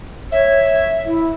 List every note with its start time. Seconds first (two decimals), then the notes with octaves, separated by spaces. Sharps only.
0.32 C#5 E5
1.06 E4